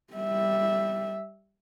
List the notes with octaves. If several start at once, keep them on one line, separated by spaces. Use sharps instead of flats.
G3 E5